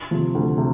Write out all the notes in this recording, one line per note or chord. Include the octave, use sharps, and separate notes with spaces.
C3 F3
D2
C3